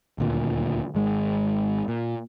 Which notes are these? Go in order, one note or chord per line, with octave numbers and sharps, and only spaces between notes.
D#1 D2 A#2
G#1 G#3
A#2